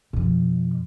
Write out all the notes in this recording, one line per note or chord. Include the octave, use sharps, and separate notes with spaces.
F2 B2